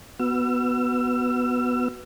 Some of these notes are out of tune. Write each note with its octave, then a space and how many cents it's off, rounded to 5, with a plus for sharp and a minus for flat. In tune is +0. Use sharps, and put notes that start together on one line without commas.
B3 +0 F#4 +0 E6 +35